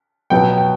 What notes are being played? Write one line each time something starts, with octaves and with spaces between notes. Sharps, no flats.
B2 F#3 B3 G5
G5